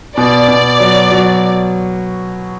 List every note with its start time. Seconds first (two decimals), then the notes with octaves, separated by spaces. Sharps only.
0.17 B2 D5
0.49 B2
0.80 F#3
1.11 F#3